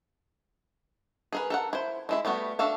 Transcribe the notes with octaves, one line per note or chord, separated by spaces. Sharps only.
G#4 A#4 B4
A4 A#4 F#5
E4 C5
G#3 E4 E5
G3 A3 B3 F#4
D4 F#4 A4 E5 F5